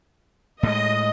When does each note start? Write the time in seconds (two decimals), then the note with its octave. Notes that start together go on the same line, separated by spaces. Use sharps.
0.63 A2 G#3 D#5